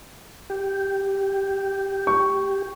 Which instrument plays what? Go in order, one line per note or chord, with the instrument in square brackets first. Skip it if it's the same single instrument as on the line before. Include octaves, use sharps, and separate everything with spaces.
[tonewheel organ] G4
[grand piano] C#6